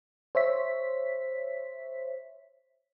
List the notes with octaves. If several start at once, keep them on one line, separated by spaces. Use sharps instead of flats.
C5 C#5 E5 B6